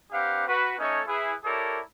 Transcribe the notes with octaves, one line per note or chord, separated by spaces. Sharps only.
C4 D4 G4 B4 F5 F#5
F#4 B4
A3 C#4 D#4 A4 C#5 D#5
E4 G#4 B4
E4 G4 A4 A#4 C#5 D5